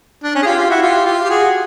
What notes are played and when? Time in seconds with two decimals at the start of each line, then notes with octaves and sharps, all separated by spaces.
0.24 D4
0.35 C#4
0.42 G#4
0.46 F4 G4
0.58 F4 G4
0.70 E4 F#4
0.82 F4 G4
1.06 F4 G4
1.25 G4
1.30 F#4 G#4